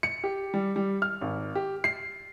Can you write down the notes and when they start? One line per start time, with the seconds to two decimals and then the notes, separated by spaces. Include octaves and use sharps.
0.03 C#7
0.24 G4
0.54 G3
0.76 G3
1.02 F6
1.21 G#1
1.55 G4
1.84 C7